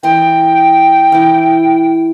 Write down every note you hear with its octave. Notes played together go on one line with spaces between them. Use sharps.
E3 D#5 G5 C6
E3 E4